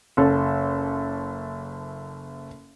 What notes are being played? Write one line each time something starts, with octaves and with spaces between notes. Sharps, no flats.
F#1 A4